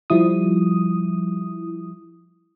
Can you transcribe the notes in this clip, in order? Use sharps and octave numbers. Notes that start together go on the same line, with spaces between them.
F3 G3 E4 D#6